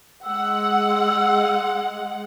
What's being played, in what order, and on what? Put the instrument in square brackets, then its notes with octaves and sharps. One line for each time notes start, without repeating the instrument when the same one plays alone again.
[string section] G#3 F#5 [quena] E6